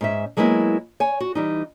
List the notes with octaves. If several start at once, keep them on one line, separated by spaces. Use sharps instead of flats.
G#2 C#4 E5
F#3 G#3 A#3 B3 E4
C#5 G#5
F#4
E3 G3 D#4